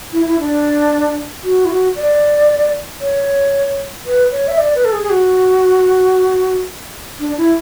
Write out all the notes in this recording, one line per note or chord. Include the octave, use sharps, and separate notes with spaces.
E4
E4
D4
F#4
E4
F#4
D5
C#5
B4
C#5
E5
D5
B4
A4
G#4
G#4
F#4
D4
E4